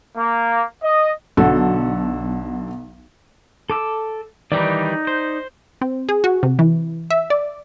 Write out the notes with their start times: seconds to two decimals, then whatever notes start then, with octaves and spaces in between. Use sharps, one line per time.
0.17 A#3
0.82 D#5
1.37 B1 D3 F#4 A4
3.70 A4 D6 E6
4.52 D#3 E3 G3 D#4 D5
5.07 C5
5.81 C4
6.09 G#4
6.24 F#4
6.43 C3
6.59 E3
7.10 E5
7.30 D5